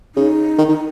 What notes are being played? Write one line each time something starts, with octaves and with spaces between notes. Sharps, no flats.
C#3 D#4
D#3
D#3